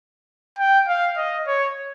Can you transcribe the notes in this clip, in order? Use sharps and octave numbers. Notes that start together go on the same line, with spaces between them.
G5
F5
D#5
C#5